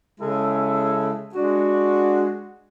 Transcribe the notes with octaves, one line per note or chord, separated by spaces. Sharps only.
C#3 G#3 C#4 E4 A4
G#3 D4 F#4